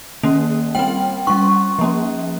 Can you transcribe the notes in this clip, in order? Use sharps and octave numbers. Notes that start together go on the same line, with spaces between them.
D#3 A#3 C#4
G3 C4 G5
G3 C#4 C#6
F3 A#3 C#4